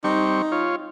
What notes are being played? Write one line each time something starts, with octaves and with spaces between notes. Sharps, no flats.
G3 C4 D#4 C#6
F4 C#5